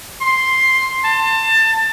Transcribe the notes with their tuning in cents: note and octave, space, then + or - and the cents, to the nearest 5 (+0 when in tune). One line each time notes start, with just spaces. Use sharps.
C6 +5
A5 +25